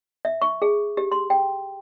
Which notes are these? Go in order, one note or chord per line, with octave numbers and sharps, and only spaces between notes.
E5
C#6
G#4
G4
C6
G5